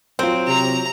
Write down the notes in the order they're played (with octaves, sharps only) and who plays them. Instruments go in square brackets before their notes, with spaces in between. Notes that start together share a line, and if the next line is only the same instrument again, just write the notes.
[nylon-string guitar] F#3 F4 [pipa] C4
[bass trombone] C3 [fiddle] A#5